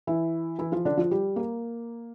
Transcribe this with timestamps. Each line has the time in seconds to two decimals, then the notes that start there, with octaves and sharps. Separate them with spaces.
0.07 E3 E4
0.59 E3 E4
0.72 F3 F4
0.85 D3 D4
0.97 F3 F4
1.11 G3 G4
1.36 A#3